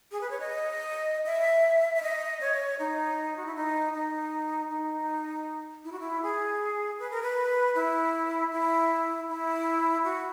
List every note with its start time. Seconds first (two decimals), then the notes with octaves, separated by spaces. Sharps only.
0.12 G#4
0.21 B4
0.30 C#5
0.40 D#5
1.26 E5
1.95 E5
2.02 D#5
2.41 C#5
2.79 D#4
3.36 F#4
3.46 E4
3.55 D#4
3.93 D#4
4.70 D#4
5.84 E4
5.92 F#4
6.00 E4
6.22 G#4
6.99 B4
7.11 A#4
7.22 B4
7.75 E4
8.52 E4
9.28 E4
10.04 F#4